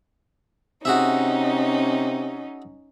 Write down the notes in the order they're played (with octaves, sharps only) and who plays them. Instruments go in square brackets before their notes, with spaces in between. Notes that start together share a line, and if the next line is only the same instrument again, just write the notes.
[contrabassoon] C3 [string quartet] C#4 D#4 [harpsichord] F#4 G#4 E5